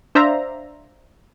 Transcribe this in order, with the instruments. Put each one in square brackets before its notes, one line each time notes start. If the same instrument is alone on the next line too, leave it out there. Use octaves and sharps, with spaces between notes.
[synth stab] D4 C5 D5 E5 F5 A#5